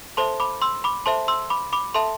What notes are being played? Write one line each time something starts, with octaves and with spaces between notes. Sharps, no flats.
A4 C5 E5 A5 C6
B5 D6
C6 E6
B5 D6
A4 C5 E5 A5 C6
C6 E6
B5 D6
B5 D6
A4 E5 A5 C6